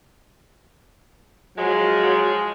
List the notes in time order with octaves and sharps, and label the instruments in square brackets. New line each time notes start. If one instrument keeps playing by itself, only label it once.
[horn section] F3 G#3 [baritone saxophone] F#3